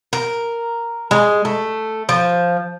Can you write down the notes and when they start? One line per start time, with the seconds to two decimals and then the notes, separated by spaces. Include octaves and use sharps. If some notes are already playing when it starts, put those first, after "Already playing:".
0.13 A#4
1.11 G#3
1.45 A3
2.09 F3